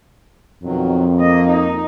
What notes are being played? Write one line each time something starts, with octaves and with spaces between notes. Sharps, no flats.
F2 B2 D#3 F#3
A#3 D#5
D#4